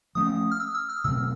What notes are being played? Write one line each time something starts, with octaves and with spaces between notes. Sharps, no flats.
F3 A3 C#4 D#6
F6
E6
E6
F6
B2 F#3 A3 C4 E6